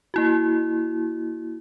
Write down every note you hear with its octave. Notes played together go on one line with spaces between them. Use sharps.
A#3 E4 F#4